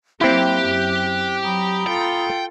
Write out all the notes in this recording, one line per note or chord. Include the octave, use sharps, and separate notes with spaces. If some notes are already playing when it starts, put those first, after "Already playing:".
F#3 A#3 C4 E4 G4 G5 F#6
F#2
F#3 A#5 B5 D#6
F4 A4 G5